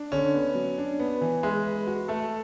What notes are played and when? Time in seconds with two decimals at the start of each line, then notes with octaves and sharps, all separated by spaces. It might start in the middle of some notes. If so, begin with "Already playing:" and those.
Already playing: D4
0.12 D3 C#4
0.34 B3
0.55 F#3
0.78 D4
0.99 B3
1.21 E3
1.43 G#3 E5
1.65 B4
1.87 F#4
2.08 A3 A4